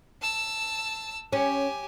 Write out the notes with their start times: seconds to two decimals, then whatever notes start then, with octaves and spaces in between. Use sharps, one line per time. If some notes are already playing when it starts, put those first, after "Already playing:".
0.21 A5 E6
1.33 C#4 G4 G#5